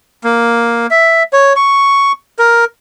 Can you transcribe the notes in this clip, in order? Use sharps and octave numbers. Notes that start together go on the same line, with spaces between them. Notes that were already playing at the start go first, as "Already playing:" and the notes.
A#3
E5
C#5
C#6
A#4